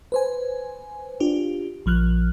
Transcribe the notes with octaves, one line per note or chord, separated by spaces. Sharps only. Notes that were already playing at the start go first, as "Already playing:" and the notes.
B4 C5 G#5
D4 F4 G4
A#1 F3 F6 F#6